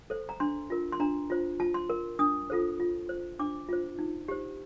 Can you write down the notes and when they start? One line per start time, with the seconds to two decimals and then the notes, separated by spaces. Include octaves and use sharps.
0.10 A4 C5
0.29 A#5
0.40 D4 C6
0.70 F4 A#4
0.92 C6
1.00 D4 A#5
1.30 F4 C5
1.60 F4 A5
1.74 C6
1.90 A#4
2.19 D4 D#6
2.50 F4 A4 C5
2.80 F4
3.09 C5
3.39 D4 D6
3.69 F4 C5
3.99 D#4
4.28 G4 C5